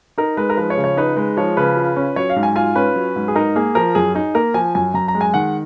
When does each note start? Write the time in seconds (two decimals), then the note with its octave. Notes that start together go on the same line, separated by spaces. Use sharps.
0.18 D#4 A#4
0.37 G#3 B4
0.50 A#4
0.57 F3 B4
0.70 C#5
0.77 C#3
0.84 C#5
0.97 D#4 B4
1.17 G#3 B4
1.37 F3 C#5
1.57 C#3 B4
1.77 F4
1.96 C#4
2.16 F#3 C#5
2.30 F5
2.36 G#2
2.43 G#5
2.56 F4 G#5
2.76 C#4 B4
2.96 F#3
3.16 G#2
3.28 G#4
3.36 D#4 A#4
3.56 A#3 G#4
3.75 F3 A#4
3.95 F#2 G#4
4.15 D#4 G#4
4.35 A#3 A#4
4.54 F3 G#5
4.75 F#2 G#5
4.94 F#2 A#5
5.08 A#5
5.15 G#3
5.21 G#5
5.34 D#3 F#5